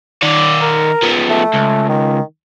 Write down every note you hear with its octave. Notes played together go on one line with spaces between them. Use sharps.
D#3 D5
A#4
F3 B3
A3
C#2
D#3